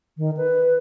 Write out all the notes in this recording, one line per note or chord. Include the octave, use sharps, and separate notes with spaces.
D#3
B4